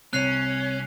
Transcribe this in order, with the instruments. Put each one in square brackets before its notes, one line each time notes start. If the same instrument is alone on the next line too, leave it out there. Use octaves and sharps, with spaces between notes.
[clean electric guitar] C2 [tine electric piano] C4 C#5 [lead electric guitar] C#4 [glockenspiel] F#6 C7 F7